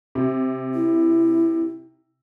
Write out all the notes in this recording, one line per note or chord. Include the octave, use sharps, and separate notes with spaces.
C3
E4